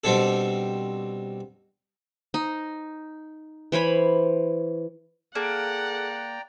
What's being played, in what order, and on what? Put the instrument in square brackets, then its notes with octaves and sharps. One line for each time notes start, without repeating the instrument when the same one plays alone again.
[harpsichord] B2 G3 C4 D4 A4
[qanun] D#4
E3 C5 C#5 B5
[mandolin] A#3 [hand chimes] G#4 A4 A5 [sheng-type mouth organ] D5 G5 A#5 [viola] F#5